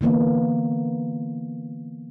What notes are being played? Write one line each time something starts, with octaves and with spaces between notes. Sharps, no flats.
D3 E3 A#3 B3